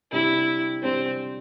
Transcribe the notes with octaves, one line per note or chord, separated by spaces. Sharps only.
C3 G3 D4 E4 G4
C3 G3 C4 D4 G4